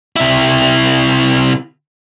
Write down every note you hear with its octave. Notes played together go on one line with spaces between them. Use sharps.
C3 E4